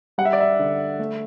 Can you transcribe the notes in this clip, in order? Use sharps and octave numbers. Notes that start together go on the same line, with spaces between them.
G3 F#5
E5
D5
E5
D3
A3